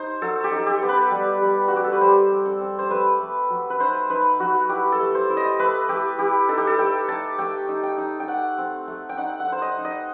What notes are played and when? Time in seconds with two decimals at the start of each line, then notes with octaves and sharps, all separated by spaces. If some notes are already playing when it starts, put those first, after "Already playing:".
Already playing: D#4 C5
0.22 F#3 A4
0.44 G4
0.51 D#4 A4
0.66 G4
0.82 B3
0.89 B4
1.11 G3
1.41 G3
1.68 G3 F#4
1.76 G4
1.84 A4
1.93 B4
2.01 G3 C5
2.31 C4
2.46 A4
2.61 C4
2.79 C5
2.91 A3 B4
3.20 A3
3.50 F#3
3.70 B4
3.80 D#4 C5
4.10 D#4 B4
4.40 F#3 F#4
4.69 E4 G4
4.92 A4
5.00 A3
5.15 C5
5.30 E4
5.37 D#5
5.59 A3 B4
5.89 A3 G4
6.19 E4 G4
6.49 D#4 A4
6.58 G4
6.67 A4
6.79 A3 G5
7.08 D#4 A5
7.38 A3 G5
7.68 D#4
7.83 G5
7.98 D#4
8.20 G5
8.28 A3 F#5
8.58 C4
8.88 A3
9.09 G5
9.18 D#4 F#5
9.40 F#5
9.47 D#4
9.52 C5
9.62 D#5
9.78 D#4
9.85 D#5